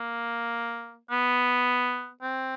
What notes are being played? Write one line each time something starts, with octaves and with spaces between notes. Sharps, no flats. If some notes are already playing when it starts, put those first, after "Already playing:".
Already playing: A#3
B3
C4